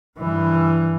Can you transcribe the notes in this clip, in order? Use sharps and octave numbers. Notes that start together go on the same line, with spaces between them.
G2 E3